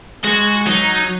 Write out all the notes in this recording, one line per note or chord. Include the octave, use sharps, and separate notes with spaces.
G#3 F#4
F#3 D#4